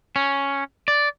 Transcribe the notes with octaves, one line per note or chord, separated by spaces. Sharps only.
C#4
D5